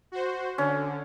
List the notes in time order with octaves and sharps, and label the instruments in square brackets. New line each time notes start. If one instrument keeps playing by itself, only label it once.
[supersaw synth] F#4 C5
[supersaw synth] D3 [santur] C#4